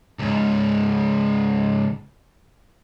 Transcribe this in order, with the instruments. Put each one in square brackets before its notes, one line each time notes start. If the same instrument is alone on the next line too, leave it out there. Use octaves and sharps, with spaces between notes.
[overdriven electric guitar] C#2 G#2